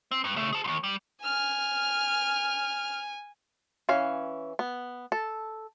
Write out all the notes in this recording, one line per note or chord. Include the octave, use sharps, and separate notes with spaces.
C4
G2
C#3 A3
G#4 A5
D#2 A#2
G3
G#5 F6
E3 C#4 F5
B3
A4